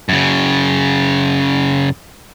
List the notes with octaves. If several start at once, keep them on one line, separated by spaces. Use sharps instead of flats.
F#2 C#3